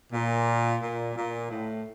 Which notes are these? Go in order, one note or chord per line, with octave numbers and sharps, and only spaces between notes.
A#2
A#2
A#2
A2